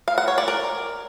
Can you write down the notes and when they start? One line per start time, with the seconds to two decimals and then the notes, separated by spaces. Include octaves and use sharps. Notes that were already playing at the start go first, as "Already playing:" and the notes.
0.08 F5
0.18 F#5
0.28 C#5
0.38 D5
0.48 A#4